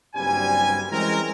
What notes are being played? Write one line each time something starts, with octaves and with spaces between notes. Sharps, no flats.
F#1 G2 G3 C4 G#5
E3 G#3 C4 C#4 A#4